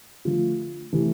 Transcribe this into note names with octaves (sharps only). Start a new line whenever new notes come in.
D3 F3 A3 F4
C3 E3 A3